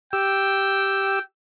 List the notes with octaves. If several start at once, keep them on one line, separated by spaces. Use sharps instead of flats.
G4 G5 E6